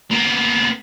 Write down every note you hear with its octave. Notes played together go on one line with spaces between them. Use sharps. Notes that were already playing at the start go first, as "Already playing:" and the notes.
A#3 B3